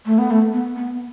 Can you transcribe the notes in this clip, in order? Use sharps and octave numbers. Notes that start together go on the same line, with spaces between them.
A3
B3
A3
B3
B3